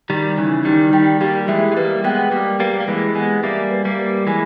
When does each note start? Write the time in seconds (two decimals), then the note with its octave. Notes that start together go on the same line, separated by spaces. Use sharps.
0.09 D#3 G3 G4
0.37 C#3 E3 D#4
0.65 D#3 G3 D#4
0.93 D#3 G3 G5
1.21 G3 A#3 G4
1.48 E3 G#3 E5
1.72 G#3
1.77 G3 A#3 B4
2.04 G#3 B3 G5
2.32 G3 A#3 G4
2.60 G3 A#3 B4
2.80 A#3
2.87 E3 G#3 B4
3.15 G#3 B3 G#5
3.43 G3 A#3 E5
3.71 B4
3.85 G3 A#3
3.99 B4
4.27 E3 G#3 G#5